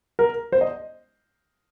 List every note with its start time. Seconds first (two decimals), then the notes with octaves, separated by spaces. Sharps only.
0.19 A#4
0.52 C5
0.61 D#5